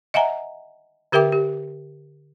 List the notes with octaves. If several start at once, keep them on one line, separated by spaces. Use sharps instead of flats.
D#5 E5 F#5 G#5 A#5
D3 G4 A#4 E5 G5 D6
G4